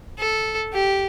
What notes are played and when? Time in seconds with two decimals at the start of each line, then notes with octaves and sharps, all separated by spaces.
0.19 A4
0.73 G4